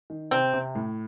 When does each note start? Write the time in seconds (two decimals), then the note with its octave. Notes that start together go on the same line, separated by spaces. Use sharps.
0.10 D#3
0.31 C3 C4
0.53 C3
0.75 A2